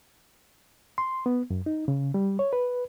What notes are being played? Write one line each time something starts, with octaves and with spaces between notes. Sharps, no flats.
C6
B3
F#2
D#4
C#3
G3
C#5
B4